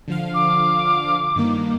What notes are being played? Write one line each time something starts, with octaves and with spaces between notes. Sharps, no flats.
D3 F3 F5
D6
G2 D#3 A#3